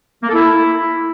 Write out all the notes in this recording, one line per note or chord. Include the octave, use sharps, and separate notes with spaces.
A#3
A4
E4